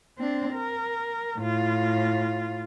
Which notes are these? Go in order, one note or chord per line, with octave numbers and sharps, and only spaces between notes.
C4 D4
A#4
A2 F4